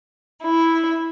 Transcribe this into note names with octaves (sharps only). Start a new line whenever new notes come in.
E4